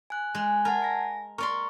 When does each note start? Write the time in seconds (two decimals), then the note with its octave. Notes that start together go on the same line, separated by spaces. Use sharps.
0.10 G#5 F#6
0.35 G#3
0.65 A#4 F#5 A5 G#6
0.82 G#5 A#6
1.38 A#4 D5 C6 C#6